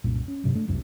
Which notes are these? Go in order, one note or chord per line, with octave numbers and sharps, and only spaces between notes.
C2 F#2 A#2
C#4
F1 G2 C3 F#3
A3 D4
F1 C2 F#2 C3